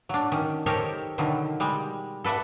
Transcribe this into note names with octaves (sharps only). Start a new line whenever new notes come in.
F#3 D4
D#3 C#4
D#4 G4 A4 A#4 C5 C#5
B2 D3 D#3 F#3
G3 G#3
A4 B4 D5 E5 F#5